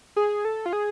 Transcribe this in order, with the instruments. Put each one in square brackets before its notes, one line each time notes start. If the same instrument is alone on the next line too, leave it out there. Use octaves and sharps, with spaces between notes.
[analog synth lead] G#4
A4
F4
G#4